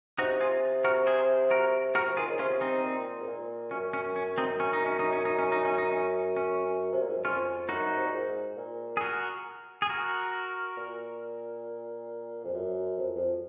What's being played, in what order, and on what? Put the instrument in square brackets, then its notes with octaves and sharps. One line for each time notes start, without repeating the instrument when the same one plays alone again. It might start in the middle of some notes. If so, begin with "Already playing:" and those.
[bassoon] C3 [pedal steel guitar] D#4 F#4
[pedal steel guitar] F4 G#4
F#4 A#4
G#4 C5
F#4 A#4
[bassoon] C3 [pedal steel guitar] F#4 A#4
[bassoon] F3
[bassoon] D#3 [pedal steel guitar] F4 G#4
[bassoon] C#3
[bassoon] C3 [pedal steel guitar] C#4 F4
[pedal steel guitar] C4 D#4
[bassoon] A#2
G#2
A#2
[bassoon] F#2 [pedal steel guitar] C#4
[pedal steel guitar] C#4
C#4
C4 D#4
C#4
D#4
C#4
D#4
C#4
D#4
C#4
D#4
C#4
D#4
C#4
C#4
[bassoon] C3
A#2
G#2
F#2
[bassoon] F2 [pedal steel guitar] C#4 F4
[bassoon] F#2 [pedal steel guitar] D#4 F#4
[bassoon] C3
A#2
G#2
A#2
[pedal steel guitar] G#4
F#4 A#4
G#4
F#4 A#4
[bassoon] A#2
F2
F#2
F2
F2